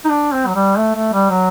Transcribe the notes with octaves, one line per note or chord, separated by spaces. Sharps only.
D#4
D4
C4
F#3
G3
A3
A3
G3
F#3